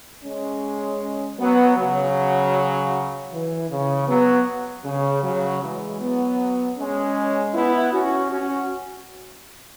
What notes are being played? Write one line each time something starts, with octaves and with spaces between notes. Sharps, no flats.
G#3 C#4
F#3 B3
C#3 F#3
E3
C#3
F#3 B3
C#3
C#3 F#3
E3 G#3
F#3 B3
G#3 C#4
B3 E4
C#4 F#4
C#4 F#4